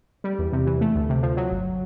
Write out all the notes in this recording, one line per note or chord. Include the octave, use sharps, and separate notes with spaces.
G3
E2
C3
E3
A3
D2
C3
F3
F#3
G1